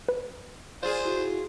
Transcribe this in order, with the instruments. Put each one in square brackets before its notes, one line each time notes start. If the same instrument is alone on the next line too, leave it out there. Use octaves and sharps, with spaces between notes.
[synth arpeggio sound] B4
[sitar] F4 G#4 [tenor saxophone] C5 [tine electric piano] D5
[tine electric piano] E4 F#4